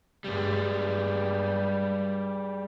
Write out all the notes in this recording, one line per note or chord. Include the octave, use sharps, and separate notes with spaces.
G2 G3 G#3